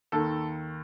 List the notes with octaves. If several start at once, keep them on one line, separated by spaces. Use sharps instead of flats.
D#2 D#3 A4